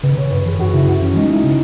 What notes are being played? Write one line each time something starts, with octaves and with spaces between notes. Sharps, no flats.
C#3 B4
C#3 C#5
F#2 B4
E3 G#4
F#2 F#4
C#3 E4
F#2 F#4
E3 C#4
G#3 D#4
G#3 E4
C#3